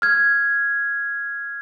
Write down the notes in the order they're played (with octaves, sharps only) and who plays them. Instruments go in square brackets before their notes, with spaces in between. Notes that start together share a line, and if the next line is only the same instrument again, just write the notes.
[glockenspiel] F6 G#6